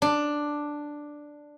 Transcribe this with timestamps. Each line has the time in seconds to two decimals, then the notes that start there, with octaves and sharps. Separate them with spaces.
0.02 D4